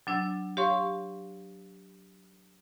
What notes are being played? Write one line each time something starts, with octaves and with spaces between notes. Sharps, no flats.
F#3 D4 E6
G4 C#5 F5 C6 C#6